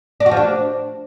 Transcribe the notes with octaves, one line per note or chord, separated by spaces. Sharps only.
D4
F#4
F3
D4